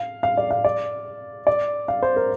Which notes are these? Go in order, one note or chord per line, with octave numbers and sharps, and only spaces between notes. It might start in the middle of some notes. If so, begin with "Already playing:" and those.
Already playing: F5
F5
D5
F5
D5
D5
F5
C5
A#4